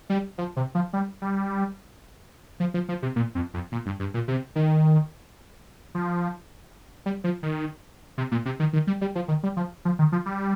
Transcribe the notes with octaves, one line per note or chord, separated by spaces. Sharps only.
G3
F3
C3
F3
G3
G3
F3
F3
F3
C3
A#2
F2
F2
A#2
G2
G2
A#2
C3
D#3
F3
G3
F3
D#3
C3
A#2
C3
D#3
D#3
G3
G3
F3
D#3
G3
F3
F3
D#3
F3
G3